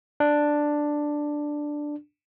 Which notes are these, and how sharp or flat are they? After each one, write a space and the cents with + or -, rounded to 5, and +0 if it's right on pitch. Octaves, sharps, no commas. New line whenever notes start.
D4 +5